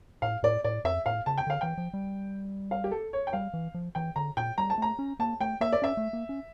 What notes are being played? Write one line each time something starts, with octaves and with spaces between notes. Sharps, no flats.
A2 F5
A2 D5
A2 D5
F2 E5
A2 F5
C#3 A5
G5
D3 F5
E3 G5
F3
G3
F5
G4
A4
C#5
G5
G3 F5
E3
F3
E3 G5
D3 A#5
A#2 G5
G3 A#5
A5
A3 A#5
C#4
A#3 A5
A3 G5
A#3 E5
D5
C#4 E5
A3
A#3
C#4